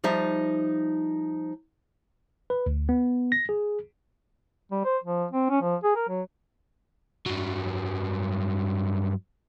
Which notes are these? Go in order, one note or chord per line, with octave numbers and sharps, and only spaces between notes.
F3 G3 D#4 E5
B4
D2
B3
A#6
G#4
G3
C5
F3
C4
C#4
F3
G#4
A#4
F#3
G2 F#3